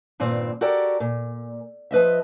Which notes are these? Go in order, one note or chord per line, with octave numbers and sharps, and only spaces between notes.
G2 A#2 D#3 C4
F#4 G4 A4 A#4 D5
A#2
F3 B4 D#5 E5